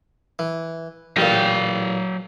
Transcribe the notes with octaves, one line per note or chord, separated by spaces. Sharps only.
E3
A1 A#2 F#3 G5